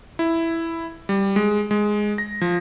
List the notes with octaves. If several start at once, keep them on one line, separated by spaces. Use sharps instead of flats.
E4
G3
G#3
G#3
A#6
F3